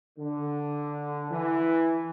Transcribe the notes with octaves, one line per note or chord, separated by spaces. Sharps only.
D3
E3